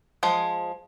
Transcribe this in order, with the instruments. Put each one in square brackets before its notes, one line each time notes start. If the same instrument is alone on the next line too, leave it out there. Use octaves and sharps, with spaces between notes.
[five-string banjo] F3 G#3 G#4